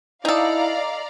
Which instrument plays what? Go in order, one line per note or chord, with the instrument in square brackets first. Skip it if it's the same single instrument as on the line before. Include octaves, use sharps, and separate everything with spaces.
[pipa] D#4 A4 [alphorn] E4 [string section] D5 F5 A#5